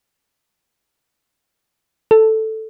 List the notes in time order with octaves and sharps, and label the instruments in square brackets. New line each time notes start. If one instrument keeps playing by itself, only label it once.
[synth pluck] A4